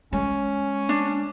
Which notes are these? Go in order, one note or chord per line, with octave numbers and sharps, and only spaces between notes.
G#3 C#4
D4